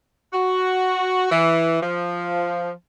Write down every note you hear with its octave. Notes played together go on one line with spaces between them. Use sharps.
F#4
E3
F3